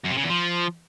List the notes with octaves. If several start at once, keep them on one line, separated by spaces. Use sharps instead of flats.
F#2
C3
C#3
E2
F3